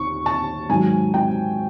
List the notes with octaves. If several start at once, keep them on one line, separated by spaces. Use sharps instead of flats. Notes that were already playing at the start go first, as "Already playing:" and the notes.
Already playing: D#2 C#6
A5
G#2 D#3 F#3 G#5
G5